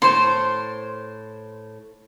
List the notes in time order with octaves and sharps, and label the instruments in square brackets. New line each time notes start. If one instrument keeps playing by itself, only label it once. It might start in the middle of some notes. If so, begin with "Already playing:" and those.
[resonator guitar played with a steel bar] A2 C5 [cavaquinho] C6